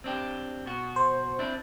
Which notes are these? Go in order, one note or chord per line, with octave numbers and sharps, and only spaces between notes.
C4 D4 G4
B2 F#4
C5
C4 D4 E4